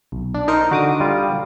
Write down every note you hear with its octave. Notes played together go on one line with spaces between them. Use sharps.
B1
D4
D#4 A#4 C5
D3 F#4 D6 D#6
G3 F4